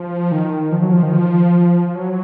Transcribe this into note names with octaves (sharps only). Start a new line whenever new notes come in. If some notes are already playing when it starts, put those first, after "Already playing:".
Already playing: F3
D#3
F3
F#3
F3
D#3
F3
F#3